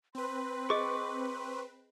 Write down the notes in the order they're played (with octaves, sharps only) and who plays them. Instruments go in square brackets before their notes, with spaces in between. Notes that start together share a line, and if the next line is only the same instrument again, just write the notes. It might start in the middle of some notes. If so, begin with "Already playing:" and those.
[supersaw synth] C4 B4 [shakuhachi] C6
[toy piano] G#4 D#5 [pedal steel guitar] C#6 D6